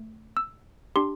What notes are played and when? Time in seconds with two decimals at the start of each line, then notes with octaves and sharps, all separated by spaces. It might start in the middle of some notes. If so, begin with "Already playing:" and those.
Already playing: A3
0.37 E6
0.96 D4 G4 C6